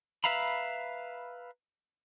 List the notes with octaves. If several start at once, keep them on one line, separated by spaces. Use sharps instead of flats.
B4 E5 F5 A#5 B5